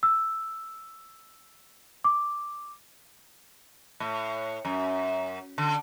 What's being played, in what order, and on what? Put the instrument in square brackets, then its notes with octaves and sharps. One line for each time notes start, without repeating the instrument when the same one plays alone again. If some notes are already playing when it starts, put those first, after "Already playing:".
[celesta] E6
D6
[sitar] A2
F#2
D3